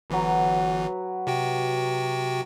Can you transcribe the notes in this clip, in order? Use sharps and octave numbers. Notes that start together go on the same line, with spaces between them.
G1 E3 F#3 B4
C3 F#4 G5